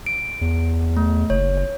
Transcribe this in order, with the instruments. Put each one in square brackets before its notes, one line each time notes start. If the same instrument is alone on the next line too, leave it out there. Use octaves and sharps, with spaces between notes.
[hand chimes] D7
[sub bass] E2
[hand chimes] A3
[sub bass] F#1 [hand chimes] C#5
[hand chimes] C#5